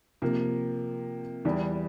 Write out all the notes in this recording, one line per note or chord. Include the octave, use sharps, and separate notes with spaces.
C3 F3 A#3
E2 E3 G3